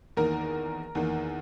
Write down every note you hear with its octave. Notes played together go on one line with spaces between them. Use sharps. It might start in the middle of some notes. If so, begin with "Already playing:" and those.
E2 D#3 A#3 A#4
E2 D#3 A#3